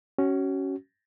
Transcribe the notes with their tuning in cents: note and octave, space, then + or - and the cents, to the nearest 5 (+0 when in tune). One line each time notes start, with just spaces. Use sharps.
C#4 +0 F#4 +30